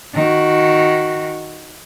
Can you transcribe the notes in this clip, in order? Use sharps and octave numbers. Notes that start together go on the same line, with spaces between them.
D#3 F#4